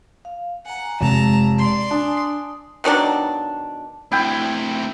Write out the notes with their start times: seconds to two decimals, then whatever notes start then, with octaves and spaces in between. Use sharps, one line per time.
0.25 F5
0.66 F#5 G#5 A#5
1.01 F1 G#3 A5 A#5
1.58 D5 C6
1.91 D4 G#5 D#6
2.84 B2 D#3 F#3 D4
4.12 D2 C3 E4 G5